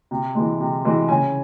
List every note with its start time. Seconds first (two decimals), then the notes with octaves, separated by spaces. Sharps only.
0.11 C3
0.35 E3 G#3
0.60 C3
0.85 E3 G#3
1.09 C#3 G#5